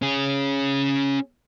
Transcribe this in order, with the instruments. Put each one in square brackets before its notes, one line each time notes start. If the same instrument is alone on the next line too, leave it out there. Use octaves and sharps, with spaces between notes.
[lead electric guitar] C#4 G#4